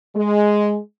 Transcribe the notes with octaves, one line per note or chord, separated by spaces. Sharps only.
G#3